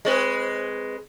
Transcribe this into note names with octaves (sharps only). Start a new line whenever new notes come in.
G#3 C4 B4